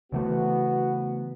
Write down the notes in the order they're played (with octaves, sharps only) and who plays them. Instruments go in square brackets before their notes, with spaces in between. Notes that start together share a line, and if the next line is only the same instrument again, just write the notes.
[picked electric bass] C#3 E3 A3 [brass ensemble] B3 F#4